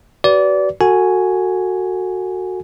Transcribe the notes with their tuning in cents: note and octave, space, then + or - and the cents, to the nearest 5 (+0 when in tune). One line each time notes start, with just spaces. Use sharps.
F#4 +40 B4 +0 D5 -25
F#4 +0 A4 +30 G#5 +5